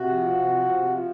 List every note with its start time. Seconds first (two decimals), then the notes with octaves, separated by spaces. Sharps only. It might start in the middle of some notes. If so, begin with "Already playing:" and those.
Already playing: C3 F#4
0.11 F3
0.29 C3
0.47 F3
0.66 C3
0.85 F3